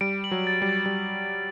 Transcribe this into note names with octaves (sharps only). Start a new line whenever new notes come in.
G3 D7
F#7
F#3
A6
G3
A6
G3